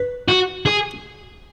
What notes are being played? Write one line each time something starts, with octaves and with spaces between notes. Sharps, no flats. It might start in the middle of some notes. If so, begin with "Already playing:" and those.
Already playing: B4
F#4
G#4